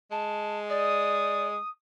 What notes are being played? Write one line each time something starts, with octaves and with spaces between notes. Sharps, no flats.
G#3 A5
D5 D#6